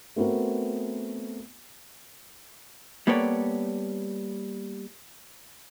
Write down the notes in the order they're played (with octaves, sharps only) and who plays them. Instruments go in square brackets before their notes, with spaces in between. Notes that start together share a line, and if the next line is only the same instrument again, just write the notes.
[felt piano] A3 B3 C4 F#4 A#4
[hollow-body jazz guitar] G3 A#3 B3 A4 C#5 D5